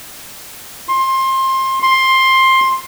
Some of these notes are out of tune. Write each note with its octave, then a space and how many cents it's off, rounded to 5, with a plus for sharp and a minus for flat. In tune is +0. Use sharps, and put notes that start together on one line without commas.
C6 +20
C6 +10